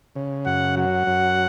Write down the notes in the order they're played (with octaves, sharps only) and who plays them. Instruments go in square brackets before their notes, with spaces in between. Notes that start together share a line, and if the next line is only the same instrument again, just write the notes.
[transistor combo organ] C#3
[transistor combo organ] F#2 [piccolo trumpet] F#5
[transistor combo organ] F#3 [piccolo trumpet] F#5
[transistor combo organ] F#2